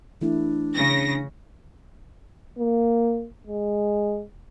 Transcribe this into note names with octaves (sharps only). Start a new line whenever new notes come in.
E3 A3 D4 E4
C#3 A#6
A#3
G#3